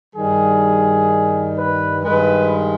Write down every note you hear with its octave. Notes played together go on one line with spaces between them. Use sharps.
G2 D#3 G3 G#4
B4
G2 D#3 G#3 B4